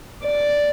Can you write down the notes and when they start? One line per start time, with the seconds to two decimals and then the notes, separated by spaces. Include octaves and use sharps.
0.23 D5